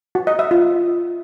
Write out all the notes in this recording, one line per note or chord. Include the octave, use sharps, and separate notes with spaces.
F#4
D#5
E5
F4